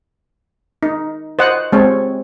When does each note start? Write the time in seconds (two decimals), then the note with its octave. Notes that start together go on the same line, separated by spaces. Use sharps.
0.83 D#4
1.39 C5 D#5 F#5
1.72 G#3 C4 C#5